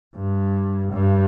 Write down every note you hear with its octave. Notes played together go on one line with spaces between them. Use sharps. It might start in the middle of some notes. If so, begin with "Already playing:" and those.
G2
G2